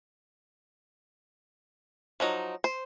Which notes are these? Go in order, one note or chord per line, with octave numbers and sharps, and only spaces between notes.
F3 F#3 D#4
C5